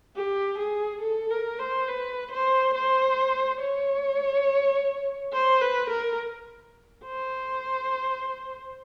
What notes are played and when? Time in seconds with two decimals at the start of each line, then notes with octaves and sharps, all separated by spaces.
0.16 G4
0.58 G#4
1.02 A4
1.30 A#4
1.59 C5
1.88 B4
2.31 C5
2.74 C5
3.60 C#5
5.32 C5
5.61 B4
5.90 A#4
7.04 C5